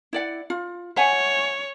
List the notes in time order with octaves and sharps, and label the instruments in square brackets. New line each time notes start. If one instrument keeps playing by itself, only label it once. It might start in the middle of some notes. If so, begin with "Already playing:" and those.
[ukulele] E4 D5 F#5
F4
[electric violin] C#5 [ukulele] E5 F#5 G#5